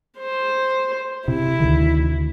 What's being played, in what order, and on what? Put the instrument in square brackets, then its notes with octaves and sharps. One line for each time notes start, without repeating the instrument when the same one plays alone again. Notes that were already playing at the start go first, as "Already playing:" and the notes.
[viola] C5
[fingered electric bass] C3 [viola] E4
[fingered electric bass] D2 D#3